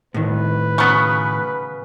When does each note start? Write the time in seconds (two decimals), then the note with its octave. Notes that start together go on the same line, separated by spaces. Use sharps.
0.14 A2 D#3 B4
0.78 C#3 F#3 B3 C#6